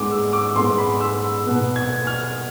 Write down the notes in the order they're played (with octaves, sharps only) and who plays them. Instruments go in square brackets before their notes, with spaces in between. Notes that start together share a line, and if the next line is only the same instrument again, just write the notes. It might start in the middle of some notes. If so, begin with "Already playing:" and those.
Already playing: [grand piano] G#2 G#3 B3 D6
E6
D6
G#2 G#3 B3 C6
B5
E6
B2 B3
G#6
F6